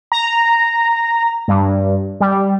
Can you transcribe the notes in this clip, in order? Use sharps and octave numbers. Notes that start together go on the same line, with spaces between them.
A#5
G2
G3